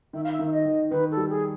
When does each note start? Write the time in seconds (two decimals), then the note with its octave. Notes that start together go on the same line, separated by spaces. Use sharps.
0.13 D#3 E5
0.23 F5
0.32 E5
0.39 D#3
0.47 E5
0.52 D#5
0.65 D#3
0.90 D#3 B4
1.11 A4
1.17 G3
1.29 G#4